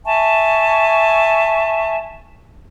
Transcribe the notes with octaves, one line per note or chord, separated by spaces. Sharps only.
E5 G#5 A5 C#6